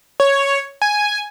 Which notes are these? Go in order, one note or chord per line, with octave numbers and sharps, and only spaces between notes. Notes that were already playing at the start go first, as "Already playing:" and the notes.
C#5
G#5